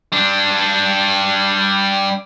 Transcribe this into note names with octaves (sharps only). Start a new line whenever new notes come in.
G3 D4